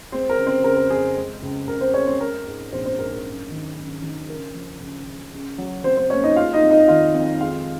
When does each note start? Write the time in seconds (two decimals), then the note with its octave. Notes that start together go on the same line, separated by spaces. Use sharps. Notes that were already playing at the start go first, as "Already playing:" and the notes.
0.12 G#3 C4 C5
0.29 A#4
0.38 C#3
0.47 C4 C5
0.64 C#3 A#4
0.77 A#4
0.90 F2 G#4
1.16 G#3
1.43 C#2
1.68 C#2 A#4
1.81 C4 C5
1.94 G#3 C#4 C#5
2.07 C4 C5
2.20 G#3 A#4
2.46 G#2
2.72 A#1 C4 C5
2.85 C4 C5
2.98 G#2 A#4
3.11 A#4
3.25 F#2
3.50 D#3
3.76 F#2
4.02 D#3
4.28 C#3 A#4
4.54 F3
4.80 C#2
5.06 C#3
5.33 C#3
5.58 F#3
5.84 F#3 C4 C5
5.97 C4 C5
6.10 A#3 C#4 C#5
6.23 D#4 D#5
6.36 G#3 F4 F5
6.53 D#4 D#5
6.62 F2
6.71 D#4 D#5
6.88 D#3 F4 F5
7.14 F2
7.40 G#3 F4 F5